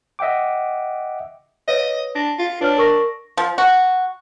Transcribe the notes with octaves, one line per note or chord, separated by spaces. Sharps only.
D#5 E5 F#5 G5 D6
B4 C#5 D#5
D4 A#6
F4
D4 B4 C#5 F6
A#4 C#6 A#6
F3
F#4